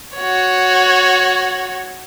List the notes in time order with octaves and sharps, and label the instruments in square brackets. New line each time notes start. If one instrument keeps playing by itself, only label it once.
[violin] F#4 C#5